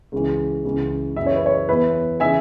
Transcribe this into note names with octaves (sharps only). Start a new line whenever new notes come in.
C#2 C#3 E3
C#2 C#3 E3
F#2 C#3 E3 E5
C#5
B4
C#5
E2 E3 B4 E5
C#3 E3 E5 G#5